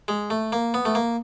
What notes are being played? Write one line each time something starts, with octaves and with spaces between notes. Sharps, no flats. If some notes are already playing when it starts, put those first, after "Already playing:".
G#3
A3
A#3
B3
A3
A#3